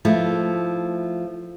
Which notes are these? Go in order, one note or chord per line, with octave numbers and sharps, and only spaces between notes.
F3 A3 E4